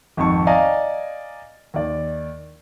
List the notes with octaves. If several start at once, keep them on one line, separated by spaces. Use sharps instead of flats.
G#1 F2 A5 C#6
D5 D#5 F5 G#5 A#5
D#2 D5